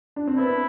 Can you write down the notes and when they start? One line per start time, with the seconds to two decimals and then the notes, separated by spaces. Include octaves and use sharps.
0.16 D4
0.27 C4
0.38 B3 E4